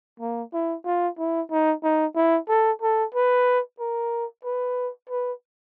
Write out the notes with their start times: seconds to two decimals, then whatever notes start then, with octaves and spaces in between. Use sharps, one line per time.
0.20 A#3
0.53 E4
0.85 F4
1.19 E4
1.51 D#4
1.83 D#4
2.16 E4
2.49 A4
2.82 A4
3.14 B4
3.80 A#4
4.44 B4
5.10 B4